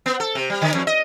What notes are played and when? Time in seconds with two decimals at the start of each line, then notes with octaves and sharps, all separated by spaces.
0.06 B3
0.20 A4
0.35 C3
0.50 G3
0.62 D3
0.74 F2
0.87 D#5